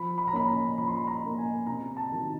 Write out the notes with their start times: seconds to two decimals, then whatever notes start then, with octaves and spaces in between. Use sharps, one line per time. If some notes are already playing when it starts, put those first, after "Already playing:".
Already playing: F3 B5
0.18 B5
0.28 A#5
0.33 A#3 C#4 B5
0.48 A#5
0.78 F3 B5
0.88 C6
0.96 B5
1.07 A#5
1.22 A#3 C#4
1.38 G#5
1.67 C3 A#5
1.97 A5
2.12 D#3 F#3